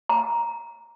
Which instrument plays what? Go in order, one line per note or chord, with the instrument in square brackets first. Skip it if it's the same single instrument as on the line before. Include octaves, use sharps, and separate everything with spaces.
[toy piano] A#5